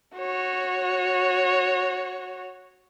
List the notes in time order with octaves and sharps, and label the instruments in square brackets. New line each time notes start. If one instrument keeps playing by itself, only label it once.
[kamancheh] F#4 C#5